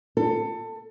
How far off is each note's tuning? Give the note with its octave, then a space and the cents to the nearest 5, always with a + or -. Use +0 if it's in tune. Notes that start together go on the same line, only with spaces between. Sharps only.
A4 +25